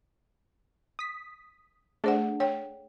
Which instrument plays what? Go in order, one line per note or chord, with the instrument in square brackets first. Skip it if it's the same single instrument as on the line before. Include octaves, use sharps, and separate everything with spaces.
[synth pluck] D#6 B6
[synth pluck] A3 D4 [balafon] G#4 C5 F#5
[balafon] C#5 G5